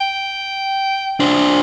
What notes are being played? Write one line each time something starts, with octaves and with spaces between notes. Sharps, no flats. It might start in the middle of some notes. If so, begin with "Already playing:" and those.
G5
D4 C5